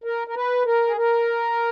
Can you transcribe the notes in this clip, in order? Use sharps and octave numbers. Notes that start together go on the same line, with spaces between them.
A#4
A#4
B4
A#4
G#4
A#4